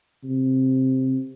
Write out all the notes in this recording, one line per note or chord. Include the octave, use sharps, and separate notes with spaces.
C3